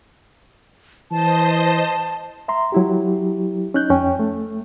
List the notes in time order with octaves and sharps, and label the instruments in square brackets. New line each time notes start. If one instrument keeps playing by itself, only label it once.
[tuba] E3 [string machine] C5 D#5 [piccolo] A5
[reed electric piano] E5 A#5 C6
F#3 E4 G4
C#4 D#4 F#6 G6
F2 C#4 G5
A3